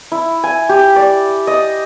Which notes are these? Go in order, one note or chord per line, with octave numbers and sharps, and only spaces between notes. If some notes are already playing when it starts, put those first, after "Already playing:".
E4
G#5
G4
D5
D#5